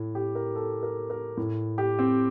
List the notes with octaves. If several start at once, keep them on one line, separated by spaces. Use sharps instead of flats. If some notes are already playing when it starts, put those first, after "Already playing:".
Already playing: A2
G4
A#4
A4
A#4
A#4
A2
G4
C4